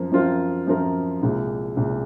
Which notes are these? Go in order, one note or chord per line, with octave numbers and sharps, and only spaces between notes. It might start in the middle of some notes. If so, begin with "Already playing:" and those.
Already playing: F#2 F3 C4 A#4
F#2 F3 C4 F4 A#4
F#2 F3 C4 F4 A#4
C2 A#2 G#3
C2 A#2 G#3